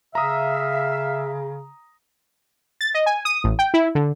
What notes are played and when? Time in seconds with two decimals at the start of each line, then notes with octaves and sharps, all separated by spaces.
0.15 C#3 E5 F5 A#5 D#6
2.81 A6
2.94 D#5
3.06 G#5
3.25 D#6
3.44 A1
3.59 G5
3.74 E4
3.95 D3